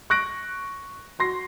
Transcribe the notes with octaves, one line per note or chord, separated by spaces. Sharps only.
C#6 F#6 A#6 D7
F#4 C6 A#6 C7